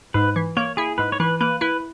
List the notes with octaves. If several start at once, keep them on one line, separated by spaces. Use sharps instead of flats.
G#2 B4
E3
A#3 C#5
E4 G#4
G#2 B4
C#5
E3 B4
A#3 B4
E4 B4